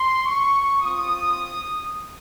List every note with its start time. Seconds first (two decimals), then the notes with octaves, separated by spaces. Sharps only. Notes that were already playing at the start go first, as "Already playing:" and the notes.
Already playing: C6
0.25 C#6
0.81 C4 F4 D#6